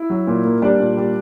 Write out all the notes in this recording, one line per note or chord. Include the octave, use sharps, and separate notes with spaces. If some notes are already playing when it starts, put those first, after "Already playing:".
Already playing: E4
F#3
A#2
A#3
G3 D4 D5
A#2
G3